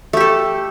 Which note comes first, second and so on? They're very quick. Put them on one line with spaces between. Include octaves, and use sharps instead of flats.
A3 G4 A4